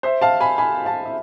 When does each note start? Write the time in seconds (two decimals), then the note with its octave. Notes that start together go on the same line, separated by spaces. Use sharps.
0.03 C5 E5
0.21 F5 A5
0.41 G#5 B5
0.58 G#5 B5
0.85 F5 A5
1.06 E5